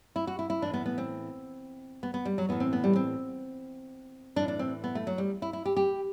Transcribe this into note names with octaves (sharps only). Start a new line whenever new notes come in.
E4
F#4
E4
E4
A2 E3 D4
B3
B3
C4
B3
B3
G3
F#3
A2 E3 B3
C4
B3
G3
C4
A2 E3 D4
D4
C4
B3
A3
F#3
G3
E4
E4
G4
G4